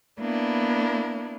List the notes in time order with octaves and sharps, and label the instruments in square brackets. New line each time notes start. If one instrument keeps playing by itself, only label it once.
[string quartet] A#3 B3 D4 E4